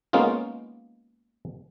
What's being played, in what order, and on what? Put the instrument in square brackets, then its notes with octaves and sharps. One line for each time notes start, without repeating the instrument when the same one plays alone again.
[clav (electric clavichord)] G#3 A#3 B3 C#4 D#4 F4